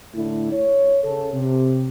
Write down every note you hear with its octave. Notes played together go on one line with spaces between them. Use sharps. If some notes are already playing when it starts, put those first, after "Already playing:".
A2 D3 A3 E4
C#5
C#3 A4
C3